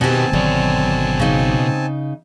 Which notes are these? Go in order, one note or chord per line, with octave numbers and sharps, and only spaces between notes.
B2 D#3 B3 C4 G4 G#5 A5
G#1 B2 D3 D#3 F#3 C#5
C#3 D#4